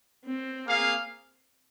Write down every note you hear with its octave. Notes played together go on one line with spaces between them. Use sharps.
C4
A#3 G#4 F5